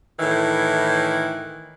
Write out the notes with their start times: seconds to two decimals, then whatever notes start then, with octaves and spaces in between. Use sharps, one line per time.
0.19 A2 D#3 E3